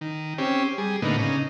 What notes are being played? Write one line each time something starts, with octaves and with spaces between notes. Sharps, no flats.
D#3
C4 C#4 G4
G3 G#4
A2 D3 A#3 B3 D#4
C#3 D#4